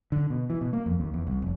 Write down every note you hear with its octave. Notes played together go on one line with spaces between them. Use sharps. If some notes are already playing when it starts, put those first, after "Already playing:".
D3
B2
E3
B2
A#3
F2
D#2
E2
C2
F1